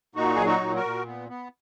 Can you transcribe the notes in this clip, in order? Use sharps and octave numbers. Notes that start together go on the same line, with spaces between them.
A#2 D#4 F#4
F#3 G#4
D#4 F#4
A#2
F#4 A#4
A#2
B3
B3